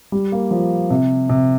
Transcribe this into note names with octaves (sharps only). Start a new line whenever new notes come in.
G3
A#3
F3
C3
C3